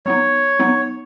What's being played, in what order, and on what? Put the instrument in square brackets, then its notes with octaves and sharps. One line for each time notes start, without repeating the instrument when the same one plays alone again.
[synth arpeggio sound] F#3 B3 D#4 [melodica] C#5
[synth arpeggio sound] F#3 B3 D#4